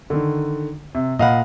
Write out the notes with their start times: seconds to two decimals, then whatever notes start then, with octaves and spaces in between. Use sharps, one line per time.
0.10 D3 D#3
0.95 C3
1.19 A#2 D#5 F5 F#5 B5